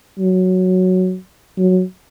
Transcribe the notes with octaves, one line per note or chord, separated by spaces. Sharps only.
F#3
F#3